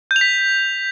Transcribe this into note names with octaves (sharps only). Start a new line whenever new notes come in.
G6
F7
B6